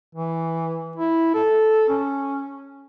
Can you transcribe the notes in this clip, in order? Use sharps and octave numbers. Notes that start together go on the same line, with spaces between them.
E3
E4
A4
C#4